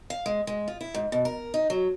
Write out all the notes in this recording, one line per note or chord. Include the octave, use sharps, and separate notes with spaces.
F5
G#3
G#3
F4
E4
G#2
B2
A#4
D#4
F#3